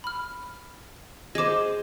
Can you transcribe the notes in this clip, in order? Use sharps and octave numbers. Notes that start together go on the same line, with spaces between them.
B5 F6
G#4 C5 D#5 D6